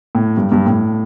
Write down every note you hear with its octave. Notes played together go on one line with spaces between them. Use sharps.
A2
G2
G2
A2